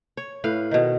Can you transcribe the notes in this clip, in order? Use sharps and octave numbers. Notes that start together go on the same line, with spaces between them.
C#5
A2 B4 F5
B2 D#3